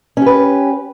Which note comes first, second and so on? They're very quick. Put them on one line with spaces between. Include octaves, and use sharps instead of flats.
C#4 G4 B4